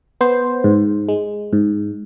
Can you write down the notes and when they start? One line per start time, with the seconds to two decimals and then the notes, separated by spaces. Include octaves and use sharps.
0.21 B3 C5
0.64 G#2
1.09 G#3
1.53 G#2